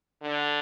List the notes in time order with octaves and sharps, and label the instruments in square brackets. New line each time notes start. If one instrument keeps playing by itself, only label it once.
[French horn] D3